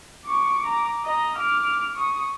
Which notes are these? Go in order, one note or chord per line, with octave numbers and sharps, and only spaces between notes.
C#6 D6
A#5 D6
D#5 A#5
D6 F6
C#6 D#6